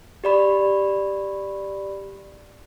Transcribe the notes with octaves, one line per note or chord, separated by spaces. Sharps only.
G4 D5 B5